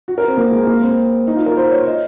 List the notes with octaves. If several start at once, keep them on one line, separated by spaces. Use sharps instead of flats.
F#4
A#4
C4
A#3
G#3
A#3
C4
D#4
F4
A#4
C5
C#5
D#5